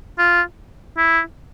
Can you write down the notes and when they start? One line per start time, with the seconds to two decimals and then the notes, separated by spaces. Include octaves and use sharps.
0.18 F4
0.97 E4